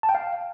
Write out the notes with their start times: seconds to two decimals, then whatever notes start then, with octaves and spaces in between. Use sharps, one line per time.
0.03 A5
0.09 G5
0.15 F5